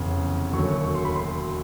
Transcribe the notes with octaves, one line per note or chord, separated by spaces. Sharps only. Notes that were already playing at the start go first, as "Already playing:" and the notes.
Already playing: F1 E2 C#3
E1 D#2 D3 F#3 C#6
C#6
C6
B5
C6